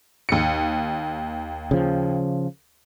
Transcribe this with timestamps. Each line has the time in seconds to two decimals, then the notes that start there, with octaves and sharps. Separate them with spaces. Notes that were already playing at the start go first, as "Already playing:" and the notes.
0.29 D#2 C#7
1.71 C#3 F3